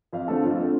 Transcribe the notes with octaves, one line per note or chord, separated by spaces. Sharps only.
F2 F5
D3 A3 C4 A4
F2 F4
D3 A3 C4